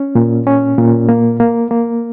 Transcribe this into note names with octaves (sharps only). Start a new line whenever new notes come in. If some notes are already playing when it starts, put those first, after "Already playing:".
Already playing: C#4
A#2
C#4
A#2
A#3
A#3
A#3